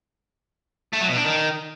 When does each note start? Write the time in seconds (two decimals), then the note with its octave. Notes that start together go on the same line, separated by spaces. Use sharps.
0.93 A3
1.01 F#3
1.09 B2
1.17 D4
1.25 D#3